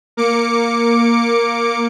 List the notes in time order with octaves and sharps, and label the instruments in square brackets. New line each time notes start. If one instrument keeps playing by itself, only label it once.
[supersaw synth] A#3 D6 C#7